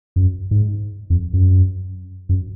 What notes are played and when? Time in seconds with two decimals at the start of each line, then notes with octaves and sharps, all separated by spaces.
0.16 F#2
0.51 G#2
1.10 F2
1.33 F#2
2.29 F#2